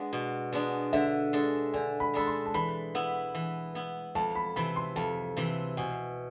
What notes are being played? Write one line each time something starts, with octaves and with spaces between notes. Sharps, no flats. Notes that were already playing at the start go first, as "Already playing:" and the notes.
Already playing: G#3 B3 D4
B2
G#3 B3 D4
D3 E5
G#3 D4 A4
D3 G#5
B5
G#3 D4 A4 B5
C6
A5
E3 B5
B3 E4
E3
B3 E4
F2 A5
B5
C3 E3 B5
C6
F2 A5
C3 E3
B2 G#5